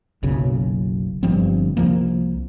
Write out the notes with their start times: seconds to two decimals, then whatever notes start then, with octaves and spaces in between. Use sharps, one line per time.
0.23 F#1 B1 F#2 C#3
1.23 G1 G2 F3 C4
1.77 C2 F3 A#3